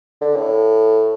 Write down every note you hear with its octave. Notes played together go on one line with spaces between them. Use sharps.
D3
A2